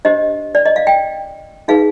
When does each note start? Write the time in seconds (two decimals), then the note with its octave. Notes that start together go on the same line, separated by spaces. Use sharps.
0.05 D4 G4 C5 D#5
0.55 D5
0.66 D#5
0.76 F5
0.87 G5
1.68 D#4 G#4 B4 F5